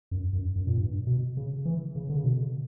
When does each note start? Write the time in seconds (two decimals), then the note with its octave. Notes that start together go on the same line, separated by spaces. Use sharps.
0.11 F#2
0.33 F#2
0.56 F#2
0.67 A#2
0.78 G2
1.07 B2
1.37 C#3
1.66 E3
1.96 C#3
2.10 D3
2.17 C#3
2.24 B2